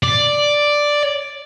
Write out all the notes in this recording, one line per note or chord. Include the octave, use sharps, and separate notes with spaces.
D5